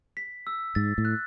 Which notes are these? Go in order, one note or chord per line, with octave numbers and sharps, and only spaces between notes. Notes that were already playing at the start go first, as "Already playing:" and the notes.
B6
E6
G#2 A6
A2
F#6